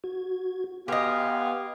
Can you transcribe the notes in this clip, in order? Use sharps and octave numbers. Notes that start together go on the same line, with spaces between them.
F#4 G#6
B3 G4 D#5 F5 G5 G#5 C6 F#6